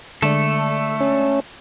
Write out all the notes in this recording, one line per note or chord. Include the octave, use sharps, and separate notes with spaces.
D3 G#3 A3 A4 D5
C#4